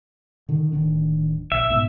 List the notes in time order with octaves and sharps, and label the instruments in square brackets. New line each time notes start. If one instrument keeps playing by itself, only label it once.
[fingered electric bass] D3 D#3
D1 D#3 D4
[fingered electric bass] A#1 [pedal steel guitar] E5
[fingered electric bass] G#2 B2